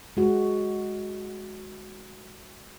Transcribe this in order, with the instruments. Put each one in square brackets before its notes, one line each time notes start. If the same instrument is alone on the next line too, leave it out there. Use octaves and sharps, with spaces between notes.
[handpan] G#3 F#4